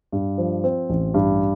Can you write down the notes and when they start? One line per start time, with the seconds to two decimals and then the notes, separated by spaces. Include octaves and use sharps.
0.12 G2
0.38 F3
0.64 C4
0.90 A1
1.14 G2